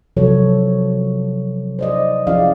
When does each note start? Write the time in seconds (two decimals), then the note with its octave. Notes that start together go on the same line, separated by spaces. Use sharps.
0.17 C3 F3 F#3 A4 C#5
1.79 C5 D5 D#5
2.27 F3 C#4 E4 G#4 D5 F5